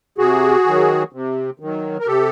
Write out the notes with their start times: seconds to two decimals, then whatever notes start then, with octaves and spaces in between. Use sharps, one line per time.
0.18 C3 F#4 G#4
0.66 D#3 F#3
1.13 C3
1.60 D#3 F#3
1.99 A#4
2.07 C3 G4 A4